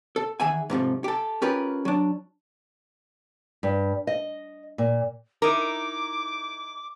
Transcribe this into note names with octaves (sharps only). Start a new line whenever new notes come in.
A4
D#3 E3 G#4 E5 F#5 G#5
G#2 C3 F3 A3
G4 A4
C#4 F4 G4 G#4 A#4 B4
F#3 D4
G2
D#5
A#2
D#4 E4 A#4 D6